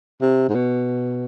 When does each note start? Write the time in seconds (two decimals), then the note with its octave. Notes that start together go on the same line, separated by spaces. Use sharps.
0.22 C3
0.49 G#2
0.55 B2